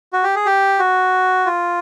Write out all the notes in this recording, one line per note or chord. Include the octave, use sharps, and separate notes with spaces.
F#4
G4
G#4
G4
F#4
F4